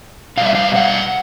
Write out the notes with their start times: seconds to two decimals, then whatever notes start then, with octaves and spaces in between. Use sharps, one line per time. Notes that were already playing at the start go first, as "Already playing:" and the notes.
0.37 B2 G3 F5
0.46 E5
0.55 F5
0.76 F#5